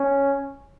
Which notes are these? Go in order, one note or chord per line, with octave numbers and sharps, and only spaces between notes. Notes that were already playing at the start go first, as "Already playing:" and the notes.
Already playing: C#4